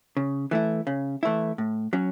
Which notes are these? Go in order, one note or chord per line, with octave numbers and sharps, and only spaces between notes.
C#3
E3 A3 E4
C#3
E3 A3 E4
A2
F#3 C#4